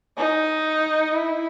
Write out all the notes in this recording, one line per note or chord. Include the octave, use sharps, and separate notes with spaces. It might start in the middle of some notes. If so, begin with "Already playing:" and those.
D#4
E4